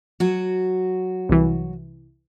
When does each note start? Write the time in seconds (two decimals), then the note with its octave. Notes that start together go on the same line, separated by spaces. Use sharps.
0.20 F#3 F#4
1.29 C2 E3